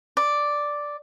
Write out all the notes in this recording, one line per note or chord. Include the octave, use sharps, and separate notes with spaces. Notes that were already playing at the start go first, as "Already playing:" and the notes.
D5